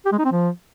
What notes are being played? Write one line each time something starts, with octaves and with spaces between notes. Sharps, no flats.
G4
G#3
D#4
C4
F3